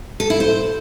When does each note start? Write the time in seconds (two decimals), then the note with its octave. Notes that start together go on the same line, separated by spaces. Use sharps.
0.20 A4
0.30 E4
0.40 C5